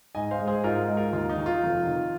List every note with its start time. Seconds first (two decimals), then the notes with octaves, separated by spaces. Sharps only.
0.15 G#2 D#5 G#5
0.31 C5 F5
0.39 G#3
0.48 G#4 C5
0.64 G#2 F4 A#4
0.88 G#3
0.97 F4 A#4
1.13 D#2 F4
1.30 D#4
1.37 D#3
1.46 F4
1.63 F1
1.87 D#3